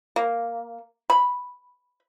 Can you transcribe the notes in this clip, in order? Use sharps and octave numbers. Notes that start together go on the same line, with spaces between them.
A#3
B5